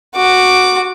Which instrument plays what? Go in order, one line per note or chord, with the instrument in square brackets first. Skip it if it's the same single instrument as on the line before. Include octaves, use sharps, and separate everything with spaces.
[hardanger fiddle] F#4 D6